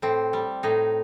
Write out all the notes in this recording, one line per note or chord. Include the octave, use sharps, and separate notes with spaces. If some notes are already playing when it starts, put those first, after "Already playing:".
A2 C4
G3
A2 D#4